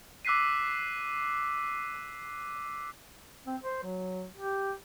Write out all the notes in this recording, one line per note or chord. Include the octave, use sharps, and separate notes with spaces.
D6 E6 F#6 B6 C7 D#7
C4
C5
F#3
G4